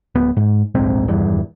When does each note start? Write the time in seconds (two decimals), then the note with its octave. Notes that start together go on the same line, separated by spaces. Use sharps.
0.15 D1 B3
0.37 G#2
0.75 D1 A#1 G#2 C4
1.08 D#1 E2 G2